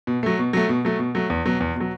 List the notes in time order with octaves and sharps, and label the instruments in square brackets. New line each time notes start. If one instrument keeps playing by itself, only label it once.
[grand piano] B2
F#3 A3
B2
F#3 A3
B2
F#3 A3
B2
F#3 A3
E2
B2 F#3
E2
B2 F#3